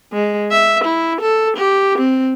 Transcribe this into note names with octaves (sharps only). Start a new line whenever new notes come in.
G#3
E5
E4
A4
G4
C4